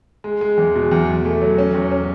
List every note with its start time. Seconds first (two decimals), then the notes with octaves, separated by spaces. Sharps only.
0.24 G#3
0.41 G#3
0.57 E2
0.75 B2
0.91 E2
1.09 E2
1.25 A3
1.41 F#3
1.58 C#4
1.74 E2
1.92 C#4